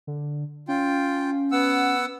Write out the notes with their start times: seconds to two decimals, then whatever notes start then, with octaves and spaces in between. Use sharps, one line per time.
0.07 D3
0.68 C#4 F4 G5
1.52 B3 F#5 E6